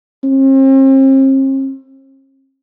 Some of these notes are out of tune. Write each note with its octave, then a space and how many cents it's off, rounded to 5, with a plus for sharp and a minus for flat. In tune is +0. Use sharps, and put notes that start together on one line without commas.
C4 +40